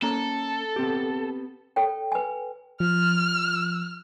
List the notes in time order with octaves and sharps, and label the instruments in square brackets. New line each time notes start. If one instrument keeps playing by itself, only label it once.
[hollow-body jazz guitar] A#3 C#4 A#5 [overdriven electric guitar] A4
[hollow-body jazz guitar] B3 C4 G4
[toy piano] A4 C#5 G5
B4 G#5
[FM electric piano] F3 [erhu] F6